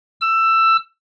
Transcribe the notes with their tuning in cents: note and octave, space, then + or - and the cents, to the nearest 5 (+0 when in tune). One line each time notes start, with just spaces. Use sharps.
E6 +15